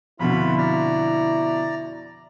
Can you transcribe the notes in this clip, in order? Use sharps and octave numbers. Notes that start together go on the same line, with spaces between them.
F2 B2 D3 E4 F4 B5
D5 A#5